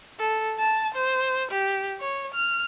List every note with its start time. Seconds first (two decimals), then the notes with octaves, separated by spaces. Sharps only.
0.19 A4
0.59 A5
0.94 C5
1.51 G4
2.00 C#5
2.34 F6